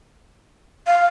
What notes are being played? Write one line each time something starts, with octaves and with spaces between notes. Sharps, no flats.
F5